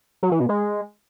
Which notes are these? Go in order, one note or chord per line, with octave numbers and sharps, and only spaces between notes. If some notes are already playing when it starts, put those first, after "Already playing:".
F#3
E3
B2
G#3